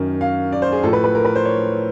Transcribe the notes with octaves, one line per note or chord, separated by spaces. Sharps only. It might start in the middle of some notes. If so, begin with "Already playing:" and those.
Already playing: F#2 D#3
F5
D5
C5
G#4
A2 F3 A4
B4
B4
A#4
B4
C5
C#5